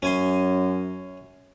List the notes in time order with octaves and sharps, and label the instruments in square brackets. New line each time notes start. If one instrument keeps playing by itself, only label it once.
[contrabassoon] F#2 [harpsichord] C#4 G#5 C6